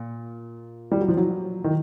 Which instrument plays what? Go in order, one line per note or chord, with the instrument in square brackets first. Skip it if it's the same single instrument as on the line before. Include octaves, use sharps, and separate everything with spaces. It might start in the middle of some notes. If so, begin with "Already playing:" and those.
Already playing: [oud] A#2
[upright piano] G3
F#3
F3
F#3
D#3